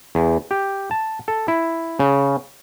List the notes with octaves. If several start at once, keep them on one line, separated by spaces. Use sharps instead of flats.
E2
G4
A5
A4
E4
C#3